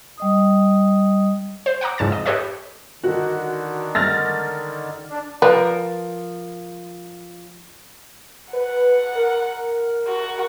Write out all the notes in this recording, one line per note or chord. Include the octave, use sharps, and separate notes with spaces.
G3 D#5 D#6
C5
F#5 G5 A#5 D6
F2 G#2 C#3 A5 A6
D#5
G4 A4 B4 C#5 D#5 E5
D3 D#3 F#4
F6 A6 A#6
D4
F3 A#4 B4 D5
B4 F#5
A#4
F#4